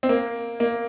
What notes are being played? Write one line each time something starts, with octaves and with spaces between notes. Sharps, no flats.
C4
A#3
A#3